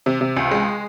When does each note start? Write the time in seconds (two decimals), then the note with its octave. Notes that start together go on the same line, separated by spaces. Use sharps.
0.06 C3
0.21 C3
0.36 C#2
0.51 G#3